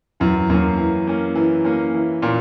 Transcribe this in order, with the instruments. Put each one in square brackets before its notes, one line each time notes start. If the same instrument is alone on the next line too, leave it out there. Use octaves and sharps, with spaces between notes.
[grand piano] F#2 [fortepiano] E3
[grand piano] F#2 [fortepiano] A#3 C#4
[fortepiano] E3
A#3 C#4
E3
A#3 C#4
E3
[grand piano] A#2 [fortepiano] A#3 C#4